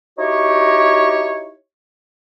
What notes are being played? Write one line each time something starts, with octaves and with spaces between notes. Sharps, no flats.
D#4 E4 F#4 G4 C#5